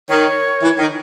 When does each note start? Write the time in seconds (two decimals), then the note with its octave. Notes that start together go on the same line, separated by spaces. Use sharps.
0.08 D#3 C#5
0.61 E3
0.78 D#3